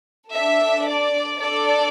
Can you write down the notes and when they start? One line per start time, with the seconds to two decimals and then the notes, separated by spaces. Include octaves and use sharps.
0.33 D4 A4 E5
0.87 D5
1.40 D4 A4 D5